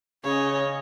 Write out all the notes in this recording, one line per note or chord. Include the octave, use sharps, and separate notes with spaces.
C#3 C#4 C#5 D#5